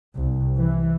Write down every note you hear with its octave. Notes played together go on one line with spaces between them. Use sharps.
C2
E3